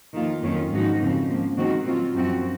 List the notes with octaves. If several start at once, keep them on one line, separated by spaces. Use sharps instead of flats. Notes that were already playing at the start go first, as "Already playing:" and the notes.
F2 D#3 A#3 F4
F2 D#3 F#3 C#4 F4
G#2 F3 A#3 D#4 F#4
F2 C#3 F3 C4
G#2 F3 A#3
D#3 G#3 C4 F#4
A#2 F#3 C4 F4
F#2 F3 C4 F#4